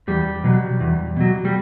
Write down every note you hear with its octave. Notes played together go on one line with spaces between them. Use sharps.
E2 G3
B2 F#3
E2
B2 F#3
G3